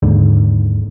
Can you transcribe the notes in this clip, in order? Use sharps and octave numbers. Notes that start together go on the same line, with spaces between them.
D#2 G#2 D3